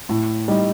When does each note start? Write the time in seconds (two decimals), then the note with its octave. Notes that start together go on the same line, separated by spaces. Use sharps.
0.09 A2
0.48 G3 D#4 G4 D#5